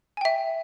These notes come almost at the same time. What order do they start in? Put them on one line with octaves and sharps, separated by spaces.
G#5 G5 E5